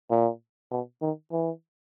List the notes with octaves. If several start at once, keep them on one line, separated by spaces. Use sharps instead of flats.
A#2
B2
D#3
E3